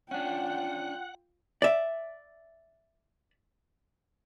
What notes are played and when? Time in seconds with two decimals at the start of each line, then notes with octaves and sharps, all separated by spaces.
0.11 C#4 D4 F4 F#5 G5
1.62 D5 E5